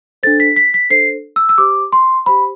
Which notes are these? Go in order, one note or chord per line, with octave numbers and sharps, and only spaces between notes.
D4 A4 C5 A6
B6
B6
B6
D4 A4 C5 C7
E6
E6
G4 C5 D6
C6
G4 C5 B5